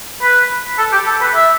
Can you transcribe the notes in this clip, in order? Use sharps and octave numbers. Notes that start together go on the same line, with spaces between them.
B4
A4
G4
A4
B4
E5